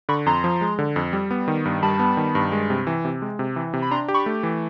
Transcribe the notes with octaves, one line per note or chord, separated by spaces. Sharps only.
D3 B5 C#6
F2 A#5 C6
F3
G#3
D3
F2
G3
B3
D#3
G2
G3 A5 B5
B3
D#3
G2
G#3
C3
E3
C3
G#3
C3
E3
C3
B5
D4 A#5 C6
G4
B5 C#6
A3
E3